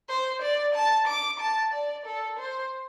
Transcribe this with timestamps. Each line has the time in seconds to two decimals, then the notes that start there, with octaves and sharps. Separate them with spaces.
0.09 C5
0.42 D5
0.74 A5
1.07 D6
1.39 A5
1.73 D5
2.05 A4
2.39 C5